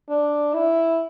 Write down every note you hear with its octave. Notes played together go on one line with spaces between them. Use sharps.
D4
E4